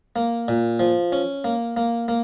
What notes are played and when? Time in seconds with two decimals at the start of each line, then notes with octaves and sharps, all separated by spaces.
0.16 A#3
0.48 A#2
0.80 F3
1.12 C#4
1.44 A#3
1.77 A#3
2.08 A#3